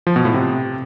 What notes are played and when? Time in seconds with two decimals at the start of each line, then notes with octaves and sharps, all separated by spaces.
0.07 F3
0.16 B2
0.25 A2
0.34 C3